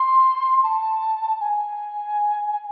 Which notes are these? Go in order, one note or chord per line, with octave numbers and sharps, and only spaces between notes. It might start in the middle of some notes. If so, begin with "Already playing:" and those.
Already playing: C6
A5
G#5